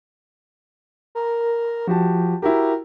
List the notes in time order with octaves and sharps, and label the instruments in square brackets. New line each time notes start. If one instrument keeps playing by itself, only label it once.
[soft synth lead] A#4
[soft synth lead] F3 [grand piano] F#4 G4 A5
[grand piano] E4 F#4 G4 [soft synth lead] A#4